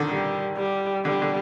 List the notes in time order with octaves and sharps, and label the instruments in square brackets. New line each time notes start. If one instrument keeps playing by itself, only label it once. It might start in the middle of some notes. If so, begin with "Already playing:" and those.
Already playing: [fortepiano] D3 D#3
[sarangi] G3
G3
[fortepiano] D3 [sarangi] G3
[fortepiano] D3